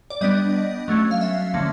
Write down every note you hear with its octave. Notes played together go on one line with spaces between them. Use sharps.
D5
G3 B3 D4 D#5
F#3 A3 C#4
F5
E5
D3 F3 A#3 C#4